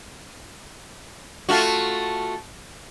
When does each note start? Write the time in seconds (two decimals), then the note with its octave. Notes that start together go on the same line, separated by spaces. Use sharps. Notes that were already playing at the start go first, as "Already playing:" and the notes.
1.49 A3 F4 F#4